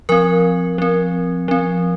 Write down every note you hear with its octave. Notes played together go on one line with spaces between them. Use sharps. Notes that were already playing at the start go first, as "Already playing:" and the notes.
F3 C4 A#4
F3 C4
F3 C4